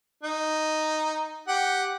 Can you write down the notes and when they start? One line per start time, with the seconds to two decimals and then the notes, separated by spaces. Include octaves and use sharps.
0.23 D#4
1.48 G4 F#5